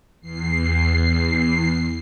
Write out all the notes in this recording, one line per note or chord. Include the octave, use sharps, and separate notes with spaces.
E2 C7